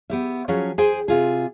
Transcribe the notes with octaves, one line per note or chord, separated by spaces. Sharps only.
B3 G4 E5
F3 F#3 C#4 G#4
G#4 C5 G5 G#5
C3 F4 G#4